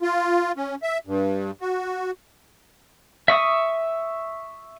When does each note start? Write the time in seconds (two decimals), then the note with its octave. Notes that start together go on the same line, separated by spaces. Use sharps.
0.01 F4
0.57 C#4
0.82 E5
1.07 G2
1.61 F#4
3.28 E5 C#6 D#6